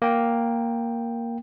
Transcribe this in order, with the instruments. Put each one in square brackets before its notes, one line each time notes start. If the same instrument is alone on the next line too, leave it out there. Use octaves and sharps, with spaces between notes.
[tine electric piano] A#3 G5